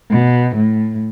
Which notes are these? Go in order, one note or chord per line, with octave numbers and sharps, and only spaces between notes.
B2
A2